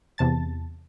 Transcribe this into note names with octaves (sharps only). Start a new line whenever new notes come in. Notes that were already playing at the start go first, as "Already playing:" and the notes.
E2 C3 A5 A6